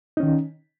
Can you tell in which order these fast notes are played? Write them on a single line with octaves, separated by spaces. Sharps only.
D#4 C#4 D#3